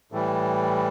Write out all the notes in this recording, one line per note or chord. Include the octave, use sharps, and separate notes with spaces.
A2 E3 G3